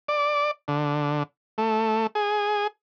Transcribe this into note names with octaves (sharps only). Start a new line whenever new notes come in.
D5
D3
A3
G#4